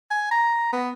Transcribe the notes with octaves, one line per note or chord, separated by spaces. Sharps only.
G#5
A#5
B3